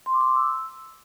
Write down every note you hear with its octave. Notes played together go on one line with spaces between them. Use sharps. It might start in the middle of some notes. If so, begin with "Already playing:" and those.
C6
D6
C6
D6
E6